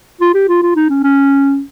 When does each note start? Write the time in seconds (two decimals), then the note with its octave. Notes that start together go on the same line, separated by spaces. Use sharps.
0.21 F4
0.35 G4
0.49 F4
0.63 F4
0.76 D#4
0.90 C#4
1.04 C#4